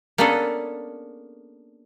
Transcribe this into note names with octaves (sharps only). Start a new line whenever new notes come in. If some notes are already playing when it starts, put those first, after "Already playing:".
A#3 B3 C#4 D4 G#4 A4